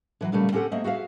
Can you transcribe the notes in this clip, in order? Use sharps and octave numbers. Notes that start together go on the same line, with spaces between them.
D3 E3 F#3
A#2 C#3 G3 A3
C4 C#4 G4 A4 F#5
A3 A#3 C4 D#5 E5
F#4 G#4 E5 F5